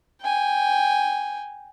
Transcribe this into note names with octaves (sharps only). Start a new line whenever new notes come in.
G5 G#5